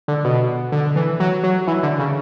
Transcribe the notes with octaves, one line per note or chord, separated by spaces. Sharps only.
D3
B2
D3
E3
F#3
F#3
E3
D3
C#3